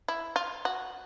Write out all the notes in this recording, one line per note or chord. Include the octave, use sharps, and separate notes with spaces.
E4
F4
F#4